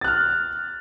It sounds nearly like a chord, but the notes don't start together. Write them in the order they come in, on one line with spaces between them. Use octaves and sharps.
A6 F#6 F6